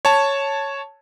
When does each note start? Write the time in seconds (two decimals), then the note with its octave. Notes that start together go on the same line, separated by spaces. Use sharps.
0.05 C#5 A5